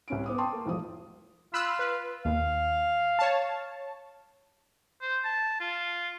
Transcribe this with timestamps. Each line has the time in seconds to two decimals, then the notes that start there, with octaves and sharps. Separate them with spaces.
0.08 C2 C#4 D7
0.26 B3 D6 D#6
0.38 G5 A5 C6 C#6 D#6
0.52 A#3
0.66 E1 A1 F3 C5 D#6
1.54 F4 B5 E6 F#6
1.79 B4
2.25 D#2 F5
3.19 C#5 A5
5.02 C5
5.24 A5
5.60 F4